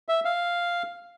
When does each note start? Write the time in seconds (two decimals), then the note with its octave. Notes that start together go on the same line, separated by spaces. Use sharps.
0.09 E5
0.25 F5